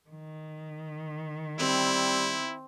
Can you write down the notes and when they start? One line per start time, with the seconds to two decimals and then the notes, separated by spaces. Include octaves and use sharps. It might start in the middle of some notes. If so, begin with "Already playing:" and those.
0.10 D#3
1.59 G3 C4 E4